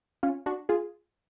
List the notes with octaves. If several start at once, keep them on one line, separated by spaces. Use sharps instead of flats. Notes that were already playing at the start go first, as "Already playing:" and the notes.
C#4 F4
D4 F#4
F4 G#4